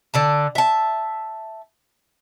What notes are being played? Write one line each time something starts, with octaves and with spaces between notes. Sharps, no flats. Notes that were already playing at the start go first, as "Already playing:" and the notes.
D3 D5 A5
E5 A5